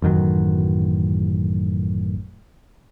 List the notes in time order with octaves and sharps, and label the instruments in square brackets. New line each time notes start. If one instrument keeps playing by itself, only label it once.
[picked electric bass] A1 F#2 D#3 F#3